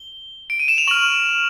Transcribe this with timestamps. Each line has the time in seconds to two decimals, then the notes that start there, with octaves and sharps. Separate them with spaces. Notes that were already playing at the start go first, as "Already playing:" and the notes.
Already playing: G7
0.50 D7
0.60 D#7
0.68 E7
0.78 F7
0.87 C#6 F6 F#7